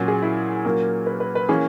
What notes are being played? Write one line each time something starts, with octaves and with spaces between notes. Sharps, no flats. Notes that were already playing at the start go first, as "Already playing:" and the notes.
Already playing: A#2 F#3 C#4
G#4
E4
A#2 F#3 A#3 C#4 A#4
B4
B4
B4
E3 A#3 C#4 G#4